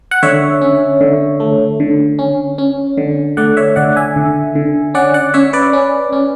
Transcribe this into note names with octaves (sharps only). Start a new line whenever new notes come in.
F#5
D3 C#5 E5
C#4
D3
A3
D3
C#4
C#4
D3
A3 D5 F#5
C#5 E5
D3 D5 F#5
E5 G#5
D3
D3
C#4 D5 F#5
D5 F#5
C#4 C#5 E5
B4 D5
C#4
C#4